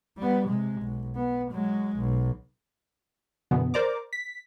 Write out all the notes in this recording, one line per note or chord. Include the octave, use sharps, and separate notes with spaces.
G3 B3
C3 G#3
B1
B3
F#3 G#3
B1
F#2 B2 D3 E3 B3
A#4 C5 D5 A#5 D6
B6